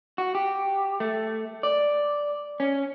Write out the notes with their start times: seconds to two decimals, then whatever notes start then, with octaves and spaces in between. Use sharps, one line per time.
0.18 F#4
0.35 G4
1.00 A3
1.63 D5
2.60 C#4